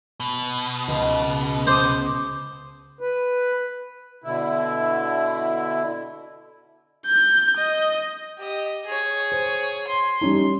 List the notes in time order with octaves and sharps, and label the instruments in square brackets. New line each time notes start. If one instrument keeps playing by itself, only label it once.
[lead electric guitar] B2
[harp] C#2
[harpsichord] C5 [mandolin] D6 D#6
[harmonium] B4
[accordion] B2 D3 E4
[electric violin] G6
D#5
[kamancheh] G4 D#5
G#4 C#5
[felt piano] C5
[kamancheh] C6
[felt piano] G3 C#4 D#4